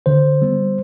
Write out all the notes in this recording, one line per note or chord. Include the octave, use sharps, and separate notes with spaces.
D3 C5
G3 B3